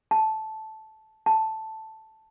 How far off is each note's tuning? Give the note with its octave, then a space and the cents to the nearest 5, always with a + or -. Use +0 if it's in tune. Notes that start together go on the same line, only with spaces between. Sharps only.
A5 -10
A5 +0